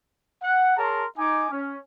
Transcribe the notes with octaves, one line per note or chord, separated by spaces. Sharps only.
F#5
G#4 A#4 C#5 A5 A#5 C6
D#4 G#5 D6
C#4